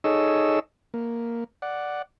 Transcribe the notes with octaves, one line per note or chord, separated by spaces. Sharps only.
D#4 G#4 A4 C#5 D#5 E6
A#3
D5 F#5